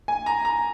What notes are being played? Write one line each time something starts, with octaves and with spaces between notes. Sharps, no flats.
G#5
A#5
A#5